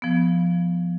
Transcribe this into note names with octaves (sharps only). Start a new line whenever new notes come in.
F3 B3